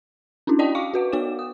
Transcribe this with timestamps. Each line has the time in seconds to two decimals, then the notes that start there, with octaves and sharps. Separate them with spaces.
0.47 C#4 D4 E4 F#4
0.59 D5 D#5 G5 A5 D#6
0.75 F5 G5 C#6 D6
0.94 F#4 B4 F#5
1.12 B3 F#4 C#5 D6 E7
1.39 D#6